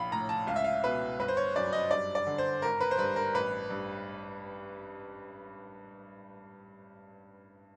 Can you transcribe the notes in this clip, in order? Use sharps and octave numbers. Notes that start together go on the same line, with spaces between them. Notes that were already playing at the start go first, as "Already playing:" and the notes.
Already playing: A#1 F5 B5
A2 A#5
A5
C#2 F5
E5
F5
B2 B4
G1 B4
C5
C#5
F#2 D5
D#5
G2 D5
D5
D3
C5
G#1 A#4
B4
C5
G2 B4
A#4
A1 B4
G2